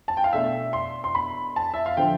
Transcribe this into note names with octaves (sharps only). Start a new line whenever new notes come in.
A5
G5
F5
B2 A3 D4 E5
C6
C6
B5
A5
E5
F5
D3 F3 G5